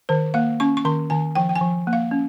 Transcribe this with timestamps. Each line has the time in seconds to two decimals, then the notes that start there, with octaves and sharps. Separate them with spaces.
0.09 D#3 C5
0.34 A#3 F5
0.60 C#4 C#6
0.77 C#6
0.85 D#3 C6
1.10 D#3 G#5
1.35 F3 G5
1.49 G5
1.56 G#5
1.61 F3
1.87 A#3
1.93 F5
2.11 C#4